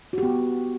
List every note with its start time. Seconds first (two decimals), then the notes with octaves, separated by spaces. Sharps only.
0.13 F#4
0.18 G4
0.23 B3